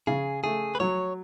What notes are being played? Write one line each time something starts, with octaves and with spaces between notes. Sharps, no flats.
C#3 G#4
A3 G#4
B4
F#3 C#5